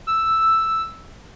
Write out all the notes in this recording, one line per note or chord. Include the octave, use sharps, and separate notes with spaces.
E6